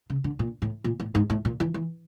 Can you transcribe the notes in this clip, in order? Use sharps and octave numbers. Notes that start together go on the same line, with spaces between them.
C#3
D3
A#2
A2
A#2
A2
G#2
A2
A#2
E3
E3